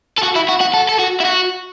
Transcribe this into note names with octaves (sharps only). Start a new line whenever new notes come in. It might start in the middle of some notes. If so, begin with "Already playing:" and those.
A4
F#4
E4
F#4
F#4
A4
A4
F#4
E4
F#4